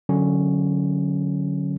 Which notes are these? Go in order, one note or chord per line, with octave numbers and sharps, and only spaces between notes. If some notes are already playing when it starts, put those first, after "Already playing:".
D3 F#3 C#4